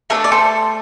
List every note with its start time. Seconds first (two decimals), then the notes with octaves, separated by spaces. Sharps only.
0.10 A3 D4 A4 A#4
0.24 D5
0.32 A4 C5